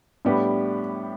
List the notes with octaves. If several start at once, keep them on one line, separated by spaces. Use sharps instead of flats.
A2 G3 B3 D4 G4